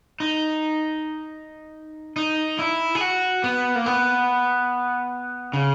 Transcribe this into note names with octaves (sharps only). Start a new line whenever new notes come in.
D#4
D#4
E4
G#4
F#4
B3
A#3
B3
C#3